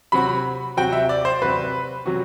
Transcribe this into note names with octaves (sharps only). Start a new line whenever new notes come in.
C3 F#3 C4 F#4 B5
C3 F#3 C4 F#4 G5
E5
D5
C5
C3 F#3 C4 F#4 B4
C3 F#3 C4 F#4